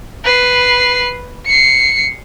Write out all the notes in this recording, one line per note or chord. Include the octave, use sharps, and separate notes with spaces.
B4 C7
C7 C#7